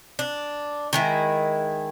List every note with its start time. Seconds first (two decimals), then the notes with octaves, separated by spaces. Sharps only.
0.19 D4
0.93 D#3 G#3 E4